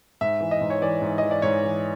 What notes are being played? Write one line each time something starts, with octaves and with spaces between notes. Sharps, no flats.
G#2 E5
E3
D#5
G#2
C#5
E3 D5
G#2
E3 D#5
D5
G#2 C#5
E3